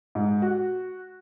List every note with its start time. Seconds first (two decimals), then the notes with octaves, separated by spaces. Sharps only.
0.15 G#2
0.42 F#4